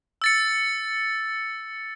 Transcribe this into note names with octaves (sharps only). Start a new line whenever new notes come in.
E6 A6 C#7